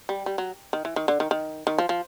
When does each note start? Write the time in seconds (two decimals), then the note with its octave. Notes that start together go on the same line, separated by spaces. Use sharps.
0.09 G3
0.26 G3
0.38 F#3
0.73 D#3
0.85 E3
0.96 D#3
1.08 D3
1.20 D#3
1.31 D#3
1.67 D#3
1.78 F3
1.89 F3